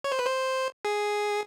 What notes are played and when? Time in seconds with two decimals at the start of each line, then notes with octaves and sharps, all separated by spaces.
0.04 C#5
0.12 C5
0.19 B4
0.26 C5
0.85 G#4